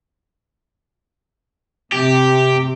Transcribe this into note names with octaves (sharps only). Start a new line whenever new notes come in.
C3 G4